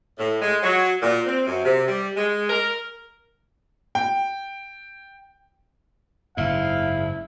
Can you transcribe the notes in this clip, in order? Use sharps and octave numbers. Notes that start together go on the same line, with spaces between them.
A2
G#3
F#3
A#2
C4
F#2
C3
G3
G#3
A#4
G5
F#1 G#2 E4 F5